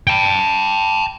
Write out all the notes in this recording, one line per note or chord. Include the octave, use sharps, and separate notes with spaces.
G5 A5